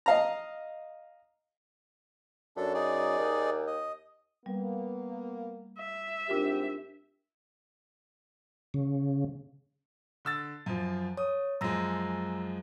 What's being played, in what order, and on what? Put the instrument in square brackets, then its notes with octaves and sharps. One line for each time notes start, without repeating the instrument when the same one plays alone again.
[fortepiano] D#5 F5 A#5
[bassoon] F#2 [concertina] D4 A4
[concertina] D#4 G#4 D5
[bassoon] D#2
[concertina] D#5
[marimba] G3 [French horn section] A#3 B3
[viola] E5
[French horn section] G#2 C4 G4 [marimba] D4 F4 A#4
[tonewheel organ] C#3
[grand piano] D3 E6 A6
F#2 F3
[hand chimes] C#5 [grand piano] D#6
[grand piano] F#2 F3 G#3 [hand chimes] A#5 E6 A#6